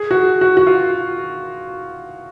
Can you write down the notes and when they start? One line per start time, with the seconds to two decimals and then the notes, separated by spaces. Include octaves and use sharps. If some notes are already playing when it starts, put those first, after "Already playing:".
Already playing: G#4
0.11 F#4
0.15 G#4
0.41 F#4
0.57 F#4
0.67 F4